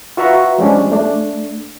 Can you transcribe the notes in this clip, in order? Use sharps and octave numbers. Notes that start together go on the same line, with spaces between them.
F4 F#4 B4 E5 A#5 C#6
F3 G3 G#3 C#4 D4
A3 D4